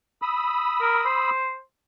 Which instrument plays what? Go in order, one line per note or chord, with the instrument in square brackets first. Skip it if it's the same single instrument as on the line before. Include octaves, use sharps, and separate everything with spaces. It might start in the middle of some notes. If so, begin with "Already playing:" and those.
[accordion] B5 D#6 E6
[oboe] A#4
C5